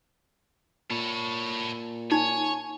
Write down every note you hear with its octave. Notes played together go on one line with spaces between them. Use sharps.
A#2 A4 C#5 B5
D#4 C#5 G#5